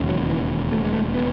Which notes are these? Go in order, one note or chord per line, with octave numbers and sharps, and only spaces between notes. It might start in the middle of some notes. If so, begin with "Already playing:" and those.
Already playing: E1 D#2 C#3
F#3
E3
A3
G#3
A3
B3